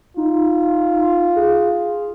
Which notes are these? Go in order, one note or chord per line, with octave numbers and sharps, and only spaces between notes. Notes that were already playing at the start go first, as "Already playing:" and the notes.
D#4 F4
G#4